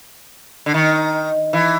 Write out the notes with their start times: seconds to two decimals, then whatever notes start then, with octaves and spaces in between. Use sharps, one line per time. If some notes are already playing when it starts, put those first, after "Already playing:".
0.66 D3
0.74 D#3
1.53 E3